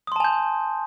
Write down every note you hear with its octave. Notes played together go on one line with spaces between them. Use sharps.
G#5 A5 C6 D#6 G6